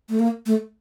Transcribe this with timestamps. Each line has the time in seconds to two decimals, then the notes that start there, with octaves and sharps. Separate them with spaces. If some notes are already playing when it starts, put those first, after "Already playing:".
0.09 A3
0.19 A#3
0.46 A3